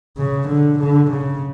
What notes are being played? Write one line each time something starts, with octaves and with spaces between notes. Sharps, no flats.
C#3
D3
D3
C#3